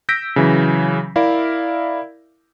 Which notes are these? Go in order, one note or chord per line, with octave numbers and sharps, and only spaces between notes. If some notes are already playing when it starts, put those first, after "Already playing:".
E6 G6 A#6 B6 D7
C#3 E3 F#3
E4 A#4 D5 E5 F5